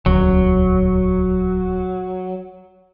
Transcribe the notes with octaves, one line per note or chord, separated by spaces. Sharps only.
D#1 C#2 F#3